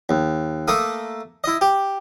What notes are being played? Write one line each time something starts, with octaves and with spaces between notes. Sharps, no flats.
D#2
A3 A#3 A4 D#6
E4 D#5
G4